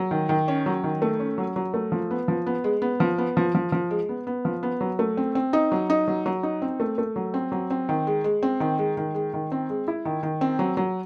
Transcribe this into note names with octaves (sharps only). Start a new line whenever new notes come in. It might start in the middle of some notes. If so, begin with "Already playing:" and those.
Already playing: F#3
D#3
D#3
C#4
F#3
D#3
A3
C#4
F#3
F#3
A3
F3
B3
F3
B3
G#3
B3
F3
B3
F3
F3
F3
G#3
B3
B3
F3
B3
F#3
A3
C4
C4
D#4
F#3
D#4
F#3
F#3
D#4
C4
A3
A3
F#3
C4
F#3
C4
D#3
G#3
G#3
C4
D#3
G#3
D#3
G#3
D#3
C4
G#3
E4
D#3
D#3
C4
F#3
F#3